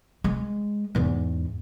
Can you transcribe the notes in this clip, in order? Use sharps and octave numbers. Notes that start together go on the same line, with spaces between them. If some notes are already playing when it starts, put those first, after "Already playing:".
G#3
E2 G#2